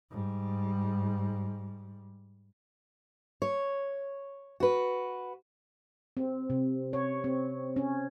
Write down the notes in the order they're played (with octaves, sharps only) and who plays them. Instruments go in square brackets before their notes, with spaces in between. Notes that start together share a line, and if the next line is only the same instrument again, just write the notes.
[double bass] G#2 G3
[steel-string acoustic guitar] C#5
F#4 B4
[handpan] C4
C3
C#5
C4
C#4